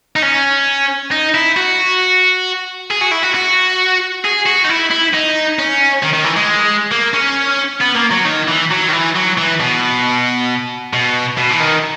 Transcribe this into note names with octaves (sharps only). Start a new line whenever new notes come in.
D#4
C#4
D#4
E4
F#4
G#4
F#4
E4
F#4
F#4
G#4
F#4
D#4
E4
E4
D#4
C#4
D#3
D#3
E3
G#3
A#3
C#4
B3
A#3
F#3
D#3
E3
F#3
D#3
E3
F#3
E3
B2
B2
B2
E3
D#3